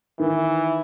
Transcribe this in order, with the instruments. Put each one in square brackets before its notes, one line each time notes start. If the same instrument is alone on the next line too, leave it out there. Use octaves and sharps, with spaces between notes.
[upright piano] D#3 [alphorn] E3